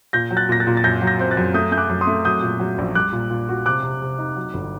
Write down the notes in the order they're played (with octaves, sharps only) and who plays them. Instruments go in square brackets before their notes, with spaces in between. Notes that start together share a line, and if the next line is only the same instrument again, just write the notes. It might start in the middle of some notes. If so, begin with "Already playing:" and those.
[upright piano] A#2 [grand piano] G6 A#6
[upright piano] F#3
[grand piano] F#6 A6
[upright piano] A#2 [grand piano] A#6
[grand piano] F#6 A6
[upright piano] A#2
[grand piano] A6
[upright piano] F#2 [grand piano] G6 A#6
[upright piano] F#3
[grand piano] G6 A#6
[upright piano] C4 [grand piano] G6
[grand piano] F#6 A6
[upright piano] F#2
[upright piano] A3 [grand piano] D#6 G6
[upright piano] A3 [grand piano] G6
[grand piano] D6 F#6
[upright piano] F#2
[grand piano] C6 D#6
[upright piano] A3
[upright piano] F#3 [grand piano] D#6 G6
[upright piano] A#2
F#3
A#1
[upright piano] G3 [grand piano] D6 F#6
[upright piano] A#2
A#2
F#4
[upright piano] C3 [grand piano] D6 F#6
[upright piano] C3
C3
D#4
F#3
G1